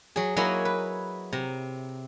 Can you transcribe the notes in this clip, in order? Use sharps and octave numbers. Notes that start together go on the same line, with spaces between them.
F#3 G#4
F#3 A#3 E4 C#5 D#5 G#5
B4
C3 A#5